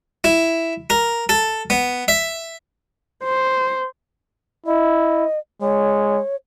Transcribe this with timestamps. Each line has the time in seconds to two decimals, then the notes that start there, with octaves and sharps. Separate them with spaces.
0.24 E4
0.90 A#4
1.29 A4
1.70 B3
2.08 E5
3.24 C5
4.66 E4 D#5
5.62 G#3 C#5